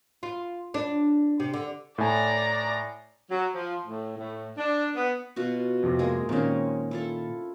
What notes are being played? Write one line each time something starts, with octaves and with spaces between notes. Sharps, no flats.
F4
D4
C3
D3
A2 D5 G#5 A#5
F#3
F3
A2
A2
D4
B3
B2 F4 F#4
F2 C3
G#3 A#3 G#4
A#2 D#3 A#3 C4 C#4
E4 F4 A4